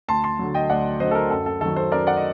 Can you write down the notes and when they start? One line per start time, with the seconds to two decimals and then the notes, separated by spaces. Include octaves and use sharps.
0.08 D2 A5 C6
0.24 A5 C6
0.39 D3 F#3
0.55 D#5 G5
0.70 D2 D5 F#5
1.00 D3 F#3 C5 D#5
1.11 A4
1.15 A#4
1.31 F#2 A4
1.46 A4
1.61 D#3 F#3 A4
1.76 A4 C5
1.92 F#2 A#4 D5
2.07 D5 F#5
2.17 D#5